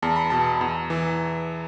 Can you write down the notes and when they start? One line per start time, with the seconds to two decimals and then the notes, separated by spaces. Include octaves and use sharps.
0.02 E2 A5
0.16 B5
0.30 B2 A5
0.61 E2
0.90 E3